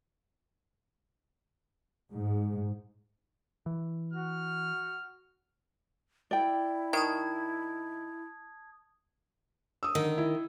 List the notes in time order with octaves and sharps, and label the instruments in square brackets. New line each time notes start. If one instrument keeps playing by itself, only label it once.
[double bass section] G#2
[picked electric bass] E3
[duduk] F#4 [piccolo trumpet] F6
[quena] E4 [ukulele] D5 G5
[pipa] D#3 [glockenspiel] A5 D#6 G#6
[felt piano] D#6 E6
[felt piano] D3 [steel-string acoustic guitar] D#3
[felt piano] E4